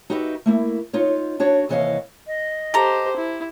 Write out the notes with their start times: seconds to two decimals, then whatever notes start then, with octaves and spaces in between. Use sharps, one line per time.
0.10 D#4 F#4 G4 B4 D#5 E5
0.46 A3 A#3 E4
0.93 D#4 F4 C#5
1.40 D4 F#4 C#5
1.69 D#2 C3 E3 C#5 D#5 F5
2.27 D#5
2.74 G4 A4 C5 A#5
3.16 E4